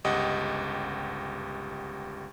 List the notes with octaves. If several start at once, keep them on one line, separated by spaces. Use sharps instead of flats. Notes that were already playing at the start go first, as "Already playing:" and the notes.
G1 C#2 G4 D#5 F#5